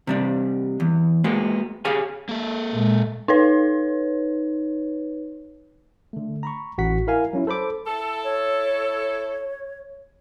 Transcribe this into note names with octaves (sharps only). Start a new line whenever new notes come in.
C3 G3 D4
E2
G#3 A#3 B3 F#4
G4 G#4 C#5 F5 G#5
A#3 A4
A#2 G#3
D#4 B4 C#5
D3 A3
A#5 B5 C#6
A1 F#4 F#5 B6
E4 A#4 F5 G#5
F#3 C#4 E4
A4 C5 B5 D6
E4 A4 A5
C#5